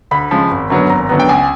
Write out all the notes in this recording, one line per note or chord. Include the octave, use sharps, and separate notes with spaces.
D2 B5
C#3 F3 G#3
G#1
F#2 D3 F#3 B3
G#1 A#5
F#2 D3 F#3 B3
G5
C#2 G#5